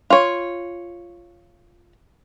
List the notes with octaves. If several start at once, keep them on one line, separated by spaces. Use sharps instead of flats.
F4 C#5